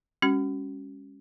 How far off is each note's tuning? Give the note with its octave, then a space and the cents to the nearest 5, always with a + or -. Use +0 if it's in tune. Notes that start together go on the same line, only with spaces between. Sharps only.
G#3 -40 C#4 +0 F#4 +35